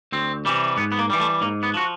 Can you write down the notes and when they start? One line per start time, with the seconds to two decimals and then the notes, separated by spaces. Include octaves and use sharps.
0.12 D2 C4
0.45 C3 E3 G3
0.77 G#2 B3
0.92 B3
0.99 A#3
1.10 E3 G3
1.20 A3
1.41 G#2 A#3
1.63 B3
1.74 F3 F#4